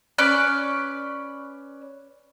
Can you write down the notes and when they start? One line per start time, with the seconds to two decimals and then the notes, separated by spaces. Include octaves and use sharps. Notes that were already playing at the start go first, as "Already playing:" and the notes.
0.18 C#4 B4 D5 F#6